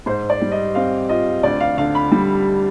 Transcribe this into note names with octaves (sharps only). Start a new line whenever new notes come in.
G#2 C5
D5
G3
D#5
C4 F5
F4 D#5
D2 D5
F5
D3 F5
B5
G3